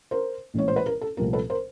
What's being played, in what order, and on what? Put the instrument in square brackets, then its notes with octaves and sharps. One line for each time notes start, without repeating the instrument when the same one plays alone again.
[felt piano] A#4 C5
A#1 A2 E3 G#3 C#4 C#5
C5
B4
A#4
A4
C2 A#2 F3 A3 C4 A#4
A4 B4
A#4 C5